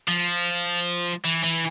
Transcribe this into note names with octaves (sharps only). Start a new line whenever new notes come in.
F3
E3
E3